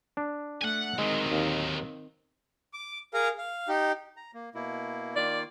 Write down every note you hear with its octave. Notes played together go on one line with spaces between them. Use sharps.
D4
A3 F#5 G#5
D2 D#3 F#3 G#3 C4
D#2
D6
G#4 A#4 F5 A#5
F5
D#4 G4
A#5
A#3
B2 A#3 E4
D#3 A#3 F4 D5